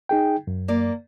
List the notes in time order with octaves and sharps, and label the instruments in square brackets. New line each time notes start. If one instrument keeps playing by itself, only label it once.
[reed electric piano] D#4 G#4 G5
F#2
[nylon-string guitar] A#3 D5